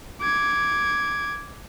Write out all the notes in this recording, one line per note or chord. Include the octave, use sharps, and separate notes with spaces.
D6 G#6